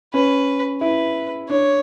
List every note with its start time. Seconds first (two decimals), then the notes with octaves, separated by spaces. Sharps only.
0.14 C#4 B4
0.81 E4 B4
1.49 D4 C#5